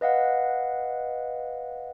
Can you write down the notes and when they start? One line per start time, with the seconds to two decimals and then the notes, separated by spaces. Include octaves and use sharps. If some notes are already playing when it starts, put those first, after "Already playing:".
0.01 B4 D#5 F5 F#5